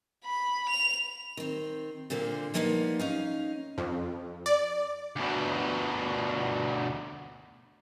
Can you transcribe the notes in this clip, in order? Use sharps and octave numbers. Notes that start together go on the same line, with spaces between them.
B5
F7
D#3 C4
A#2 D3 A#3 C4
F3 G3 A#3 B3 D4 D#4
C#4 D#4 F5
F2
D5
D2 B2